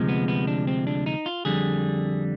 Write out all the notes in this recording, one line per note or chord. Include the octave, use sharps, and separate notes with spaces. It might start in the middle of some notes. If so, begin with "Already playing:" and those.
Already playing: D2 C3 F3 G#3
B3
B3
D4
C4
D4
D#4
F4
F2 D3 G3 G#4